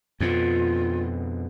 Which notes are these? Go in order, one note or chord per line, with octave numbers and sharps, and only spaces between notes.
F2 B2 F4